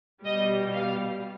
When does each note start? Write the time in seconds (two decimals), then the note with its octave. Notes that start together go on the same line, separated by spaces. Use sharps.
0.24 B2 G3 D#5
0.75 F5